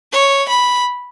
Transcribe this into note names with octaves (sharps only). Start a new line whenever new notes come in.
C#5
B5